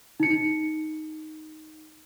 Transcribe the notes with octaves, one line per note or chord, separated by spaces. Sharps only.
D#4 C#7